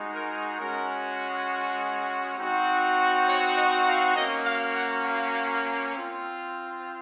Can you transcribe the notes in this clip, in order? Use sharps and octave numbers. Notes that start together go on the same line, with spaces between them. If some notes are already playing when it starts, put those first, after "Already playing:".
Already playing: G#3 D#4 F#4
A#4
G#3 C#4 F#4 A#4
C4 D#4 F#4
C#5
D#5
F5
A#3 C#4 F#4 D#5
F5
F#5
F5
C4 F4